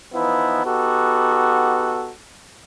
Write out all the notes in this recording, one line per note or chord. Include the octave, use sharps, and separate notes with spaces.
E3 F3 B3 D#4 E4
B3 D#4 F#4 G4 A4